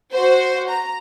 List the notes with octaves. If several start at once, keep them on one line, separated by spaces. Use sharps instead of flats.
F#4 C5
A#5